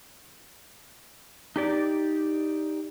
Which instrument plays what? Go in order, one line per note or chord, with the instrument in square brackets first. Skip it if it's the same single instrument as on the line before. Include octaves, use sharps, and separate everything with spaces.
[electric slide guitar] D#4 G4 D5